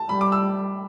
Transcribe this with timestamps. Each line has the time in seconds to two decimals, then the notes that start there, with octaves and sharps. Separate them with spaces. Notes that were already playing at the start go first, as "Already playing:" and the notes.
Already playing: A5
0.09 G3 B5
0.21 D6
0.32 E6